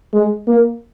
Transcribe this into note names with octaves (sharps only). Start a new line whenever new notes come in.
G#3
A#3